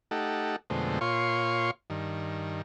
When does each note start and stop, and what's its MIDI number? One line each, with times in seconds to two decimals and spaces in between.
0.11 0.56 57
0.11 0.56 63
0.11 0.56 67
0.11 0.56 69
0.11 0.56 78
0.70 0.99 41
0.70 0.99 47
0.70 0.99 50
0.70 0.99 56
0.70 0.99 57
0.70 0.99 72
1.01 1.71 46
1.01 1.71 65
1.01 1.71 73
1.01 1.71 77
1.01 1.71 84
1.01 1.71 85
1.90 2.62 43
1.90 2.62 51